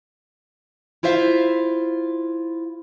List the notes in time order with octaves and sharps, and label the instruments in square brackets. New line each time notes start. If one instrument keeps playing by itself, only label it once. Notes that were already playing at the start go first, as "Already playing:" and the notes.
[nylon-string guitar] E4 F4 C5 E5 F5